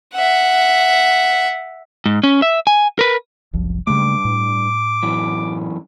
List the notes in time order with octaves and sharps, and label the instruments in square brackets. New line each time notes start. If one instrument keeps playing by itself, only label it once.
[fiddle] E5 F#5
[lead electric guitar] G#2
C#4
E5
G#5
A#4 B4
[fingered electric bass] F#1 C2 F3
[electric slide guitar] G2 [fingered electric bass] C#3 G#3 A3 [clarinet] D6
[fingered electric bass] A2
[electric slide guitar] F#2 E3